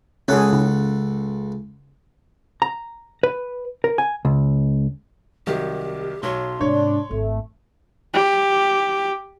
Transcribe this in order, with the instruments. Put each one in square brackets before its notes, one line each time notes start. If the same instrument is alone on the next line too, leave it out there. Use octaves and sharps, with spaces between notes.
[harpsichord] C#2 A4 F#5 [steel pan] C#4 G#4
[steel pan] C#3
[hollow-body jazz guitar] A#5
B4
A#4
G#5
C#2
[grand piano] C2 D#3 F#3 [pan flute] G4
[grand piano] B1 F#3 C#5 [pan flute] C6
[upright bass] G#2 C3 [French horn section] D4 [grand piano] C#5
[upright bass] G#1 [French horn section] A3
[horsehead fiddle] G4